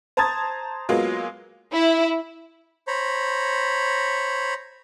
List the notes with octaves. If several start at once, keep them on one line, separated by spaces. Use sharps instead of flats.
C5 A5 A#5 D#6 G#6 A6
F#3 G#3 A#3 B3 F4
E4
C5 C#5 A#5 B5